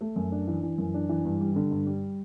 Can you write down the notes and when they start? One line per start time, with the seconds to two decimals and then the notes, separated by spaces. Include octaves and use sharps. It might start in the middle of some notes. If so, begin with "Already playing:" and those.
0.01 A3
0.16 F#2
0.32 D4
0.47 E3
0.63 E3
0.78 F#2
0.94 D4
1.09 E3
1.25 G2
1.41 G3
1.56 D3
1.71 G2
1.87 G3